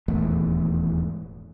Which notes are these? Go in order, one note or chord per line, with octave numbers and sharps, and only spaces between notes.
D#1 E2 G#2 A3